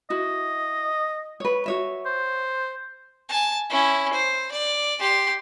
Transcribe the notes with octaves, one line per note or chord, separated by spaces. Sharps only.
E4 F#4 D#5
B4 C#5
F#4 C#5 E5
C5
G#5 A5
C#4 E4
C5
D5
G4 C6